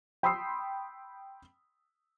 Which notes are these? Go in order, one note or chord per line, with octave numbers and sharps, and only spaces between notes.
G5 B5 C6 D#6 E6 C7